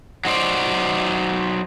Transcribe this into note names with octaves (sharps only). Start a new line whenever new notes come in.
F#3 D#4 C5 D5